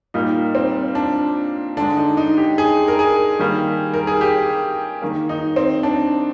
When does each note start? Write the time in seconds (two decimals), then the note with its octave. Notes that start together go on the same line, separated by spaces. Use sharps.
0.14 A#2 G3 A#3 D#4
0.55 C4
0.95 D4
1.77 D3 G#3 D4
1.97 D#4
2.17 D#4
2.37 G4
2.58 G#4
2.88 A#4
2.99 G#4
3.39 D#3 G3 A#3
3.94 A#4
4.07 G#4
4.21 G4
5.02 D#3 A#3
5.29 D#4
5.56 C4
5.83 D4